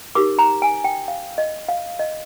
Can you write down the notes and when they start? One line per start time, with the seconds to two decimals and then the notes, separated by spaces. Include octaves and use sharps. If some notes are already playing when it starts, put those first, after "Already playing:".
0.15 D#4 G4 A#4 D6
0.39 A#5
0.62 G#5
0.84 G5
1.08 F5
1.38 D#5
1.69 F5
1.99 D#5